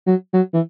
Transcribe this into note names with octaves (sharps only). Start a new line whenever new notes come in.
F#3
F#3
E3